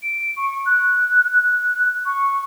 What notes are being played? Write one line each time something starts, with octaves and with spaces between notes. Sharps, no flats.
D7
C#6
F#6
F#6
C#6